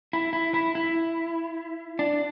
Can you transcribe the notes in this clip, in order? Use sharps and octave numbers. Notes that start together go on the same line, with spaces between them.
E4
E4
E4
E4
D4